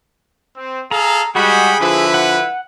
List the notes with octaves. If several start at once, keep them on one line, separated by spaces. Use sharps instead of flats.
C4
G#4 A4 F5 A#5
G3 G#3 F#4 G#4 F#5 G5 B5
D3 F3 E4 B4 E5
F#5